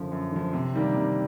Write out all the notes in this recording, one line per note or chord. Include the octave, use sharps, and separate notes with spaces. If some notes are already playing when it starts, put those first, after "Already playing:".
Already playing: F#2 D3 F3
F#2
D3 F3
C3
D#3 G3 A#3 D4
C3